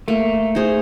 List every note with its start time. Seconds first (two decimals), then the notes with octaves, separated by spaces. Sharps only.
0.08 A3 A#3
0.55 D#4 G#4 C5